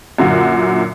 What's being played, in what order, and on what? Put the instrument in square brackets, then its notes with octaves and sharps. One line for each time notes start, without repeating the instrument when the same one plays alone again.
[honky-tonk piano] F#2 A#2 D3 F#4